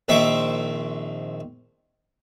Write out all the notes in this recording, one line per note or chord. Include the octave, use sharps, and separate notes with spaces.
A#1 D#3 C4 E5 C#6 D6